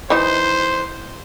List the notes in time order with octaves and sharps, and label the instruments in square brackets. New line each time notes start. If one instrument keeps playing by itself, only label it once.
[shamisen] E3 D#4 [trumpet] C5